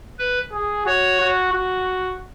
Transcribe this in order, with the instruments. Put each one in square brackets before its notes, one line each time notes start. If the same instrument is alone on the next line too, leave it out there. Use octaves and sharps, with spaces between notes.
[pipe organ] B4
[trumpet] G#4
[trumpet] F#4 [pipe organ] C#5
[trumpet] F#4
F#4